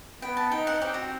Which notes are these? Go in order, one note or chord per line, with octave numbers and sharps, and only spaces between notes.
B3 G5
A5
D#4 G5
F#5
C4 G4
F#4